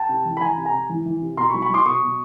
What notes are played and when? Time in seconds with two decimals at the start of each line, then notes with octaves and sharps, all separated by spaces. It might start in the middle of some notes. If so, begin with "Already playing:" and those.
Already playing: G5 A5
0.09 C3
0.25 E3
0.37 B5
0.41 E3 G#5 A#5
0.57 C3
0.65 G#5 A#5
0.73 C3
0.89 E3
1.06 E3
1.21 C3
1.37 B2 A#5 C6
1.50 B5 C#6
1.54 F#3
1.62 B5 C#6
1.70 F#3 C6 D6
1.86 B2 C#6 D#6
2.02 B2